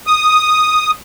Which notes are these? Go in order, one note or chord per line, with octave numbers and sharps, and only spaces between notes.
D#6